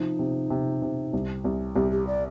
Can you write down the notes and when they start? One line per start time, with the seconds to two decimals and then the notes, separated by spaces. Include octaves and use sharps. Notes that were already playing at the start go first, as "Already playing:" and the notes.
Already playing: C3 F3 D#4
0.19 C3
0.50 C3
0.82 C3
1.13 C2
1.44 C2
1.75 C2 G4
1.92 G4
2.07 D5